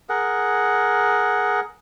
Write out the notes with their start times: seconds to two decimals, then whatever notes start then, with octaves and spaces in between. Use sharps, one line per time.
0.09 G#4 A#4 F#5